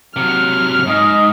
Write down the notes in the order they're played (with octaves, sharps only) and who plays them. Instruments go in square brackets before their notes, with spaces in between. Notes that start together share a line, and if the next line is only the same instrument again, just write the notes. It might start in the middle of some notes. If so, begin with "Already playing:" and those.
[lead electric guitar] C3 F#3 [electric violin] F6
[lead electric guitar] G#2 [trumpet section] D#5